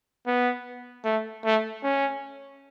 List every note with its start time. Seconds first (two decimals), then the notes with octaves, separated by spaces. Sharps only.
0.26 B3
1.05 A3
1.45 A3
1.84 C#4